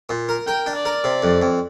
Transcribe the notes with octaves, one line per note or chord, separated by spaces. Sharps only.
A#2
A#4
A#4 G5
D4
D5
A#4
C3
F2
F2